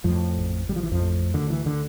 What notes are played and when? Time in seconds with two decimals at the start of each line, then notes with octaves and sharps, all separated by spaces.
0.04 F2 A2 F3
0.38 A1
0.69 A1 G3
0.76 F3
0.83 E3
0.92 F2 F3
1.02 A2
1.34 D2 D3
1.50 E3
1.66 D3